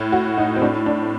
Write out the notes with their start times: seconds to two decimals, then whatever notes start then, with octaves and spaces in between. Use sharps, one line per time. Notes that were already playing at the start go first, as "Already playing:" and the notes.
Already playing: A2
0.12 F#4
0.38 D#4
0.56 C4
0.61 A2 D4
0.86 D4